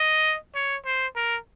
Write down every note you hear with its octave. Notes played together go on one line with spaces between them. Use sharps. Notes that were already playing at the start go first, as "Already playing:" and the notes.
Already playing: D#5
C#5
C5
A#4